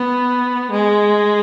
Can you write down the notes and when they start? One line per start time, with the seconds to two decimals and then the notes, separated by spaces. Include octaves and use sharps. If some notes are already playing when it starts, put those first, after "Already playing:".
Already playing: B3
0.71 G#3